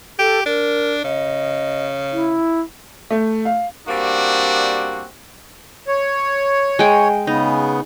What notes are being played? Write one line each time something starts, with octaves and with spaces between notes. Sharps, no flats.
G4 A4
D4 A#4
C#3 D#5
E4
A3
F5
G3 A#3 C4 D4 F#4
C#5
G#3 G5
C#3 B3 D#4